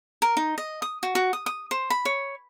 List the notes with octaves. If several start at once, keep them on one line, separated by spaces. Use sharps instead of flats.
A#4
D#4
D#5
D#6
F#4
F#4
D#6
D#6
C5
B5
C#5